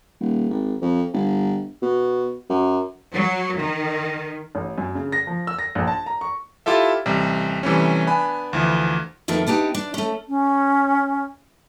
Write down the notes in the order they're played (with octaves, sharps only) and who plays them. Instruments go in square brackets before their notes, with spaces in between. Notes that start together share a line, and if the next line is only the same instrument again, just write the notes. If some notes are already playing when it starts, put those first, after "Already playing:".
[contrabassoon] D#1
G#1
F2
G1
B2
F#2
[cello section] F#3
D#3
[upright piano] A1
F#2
C#3
A#6
F3
E6
A#6
A#1
A5
A#5
C#6
[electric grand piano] E4 F4 G4 A4 E5
A1 C3 G3
C3 E3 G3 A3 C#4
B3 D4 G#5 B5
D2 E3 F3
[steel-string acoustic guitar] F2 D#3 A3 B3
B3 D4 D#4 G4
D4
A3 C#4
[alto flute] C#4